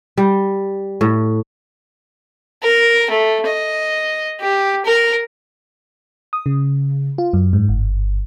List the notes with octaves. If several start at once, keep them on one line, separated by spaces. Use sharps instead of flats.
G3
A2
A#4
A3
D#5
G4
A#4
D#6
C#3
F4
F#2
G#2
G1